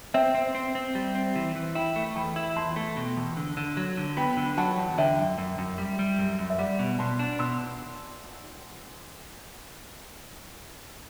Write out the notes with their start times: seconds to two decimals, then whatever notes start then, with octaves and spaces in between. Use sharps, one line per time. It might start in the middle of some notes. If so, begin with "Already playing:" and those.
0.14 C4 E5 G5
0.35 C4
0.55 C4
0.75 C4
0.95 G3
1.15 C4
1.36 E3
1.55 E3
1.75 E4 G5 B5
1.96 A3
2.16 E2 G5 B5
2.36 E4
2.56 E2 A5 C6
2.76 A3
2.97 B2
3.16 E2
3.37 D3
3.57 D3
3.77 F#3
3.97 D3
4.17 B3 G5 B5
4.37 D3
4.58 F#3 F#5 A5
4.78 E2
4.98 D3 E5 G5
5.18 F#2
5.38 F#2
5.58 F#2
5.78 G3
5.99 G3
6.19 F#2
6.39 F#2
6.50 E5
6.58 G3 D5 F#5
6.79 B2
6.99 B2 A5 C6
7.19 D4
7.39 B2 C6 E6